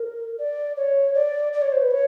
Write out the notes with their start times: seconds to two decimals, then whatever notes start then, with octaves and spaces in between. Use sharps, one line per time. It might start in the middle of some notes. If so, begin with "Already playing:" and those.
Already playing: A#4
0.38 D5
0.77 C#5
1.15 D5
1.53 D5
1.62 C#5
1.72 C5
1.81 B4
1.91 C#5